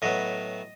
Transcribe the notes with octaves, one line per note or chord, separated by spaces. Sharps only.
A2 F#3 B3 D#5